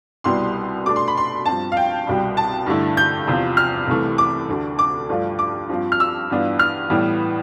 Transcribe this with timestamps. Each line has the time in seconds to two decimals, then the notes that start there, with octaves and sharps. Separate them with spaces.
0.24 C2 B2 G3 B3 E4 C6
0.85 B2 A3 D4 D6
0.96 C6
1.08 B5
1.17 C6
1.46 G2 F3 C4 A5
1.72 F5
1.77 G5
2.07 C2 B2 G3
2.37 A5
2.66 G2 D3 A3 E4
2.97 G6
3.27 E2 C3 F3 C4 F4
3.57 F6
3.87 C2 C3 E3 A3
4.18 D6
4.49 D2 D3 A3
4.79 D6
5.09 G2 F3 A3 D4 F4
5.39 D6
5.69 G2 F3 C4 F4
5.92 F6
6.00 E6
6.30 G2 E3 B3 D4 F4
6.59 F6
6.90 A2 E3 G3 B3